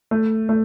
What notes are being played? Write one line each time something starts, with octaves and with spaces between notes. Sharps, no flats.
A3
A3